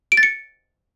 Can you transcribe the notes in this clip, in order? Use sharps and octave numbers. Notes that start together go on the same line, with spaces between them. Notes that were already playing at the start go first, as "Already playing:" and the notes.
D7
A6
C#7